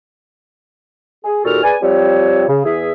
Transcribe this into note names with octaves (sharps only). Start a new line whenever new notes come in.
G#4
D#2 A#2 F#4 G4 A4 F6
G#4 B4 D5 G#5
F3 G3 C4 C5 C#5
C#3
E2 G#4 E5